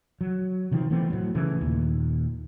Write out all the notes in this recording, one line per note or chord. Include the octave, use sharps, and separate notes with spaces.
F#3
C3 D#3 F3 C4
E3 A3 B3 C4
A2 F#3
C#3 E3 A3
D#2 A#2